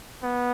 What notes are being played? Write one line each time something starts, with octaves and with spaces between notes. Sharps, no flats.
B3